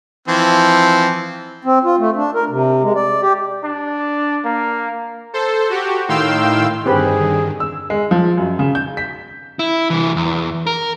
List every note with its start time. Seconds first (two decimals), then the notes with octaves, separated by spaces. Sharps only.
0.28 E3 F3 C4
1.65 C4
1.84 F4
1.99 A3
2.16 D4
2.35 A#4
2.50 C3
2.83 G#3
2.95 D5
3.21 G4
3.63 D4
4.45 A#3
5.33 A4 C5
5.70 F#4 G4
6.08 A2 D#3 F5 G5 C6 E6
6.86 G2 D3 D#3 C4 G4 G#4 B4
7.60 E6
7.90 G#3
8.11 F3
8.37 F#2
8.59 C#3
8.75 G6
8.97 B6
9.59 E4
9.90 C2 E3
10.16 E2
10.67 A#4